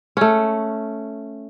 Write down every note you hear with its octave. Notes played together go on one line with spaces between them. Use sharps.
A3 C#4